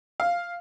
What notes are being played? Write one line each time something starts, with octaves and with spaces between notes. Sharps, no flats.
F5